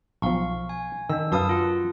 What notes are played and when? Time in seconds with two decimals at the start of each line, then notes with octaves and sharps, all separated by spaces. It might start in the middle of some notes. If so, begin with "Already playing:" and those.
0.22 B1 F3 F5 C#6
0.69 G#5
1.10 D#3 D4 E6
1.32 F#2 A#4 B4 F5 A5 D#6
1.49 F4 F#5